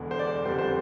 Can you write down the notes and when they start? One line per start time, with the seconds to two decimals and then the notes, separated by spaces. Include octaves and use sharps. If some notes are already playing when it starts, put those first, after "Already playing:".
Already playing: E1 E2 D3
0.11 C5
0.19 D5
0.45 F1 F2 D3 G3 C5
0.59 C5